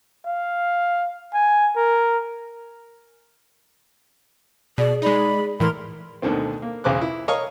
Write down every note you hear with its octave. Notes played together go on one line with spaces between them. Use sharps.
F5
G#5
A#4
B2 G#4 D5
G#3 D#4 D5 B5
A2 E3 A#4 B5 C6
D2 B2 D3 D#3 C4
A#3
B1 E2 C#3 C5 D6 F#6
E4
C#5 D#5 F5 A#5 C#6